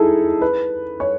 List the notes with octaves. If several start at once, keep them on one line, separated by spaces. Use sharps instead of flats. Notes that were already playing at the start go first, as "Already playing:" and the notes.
Already playing: D#4 E4 G#4 A4
B4
C#5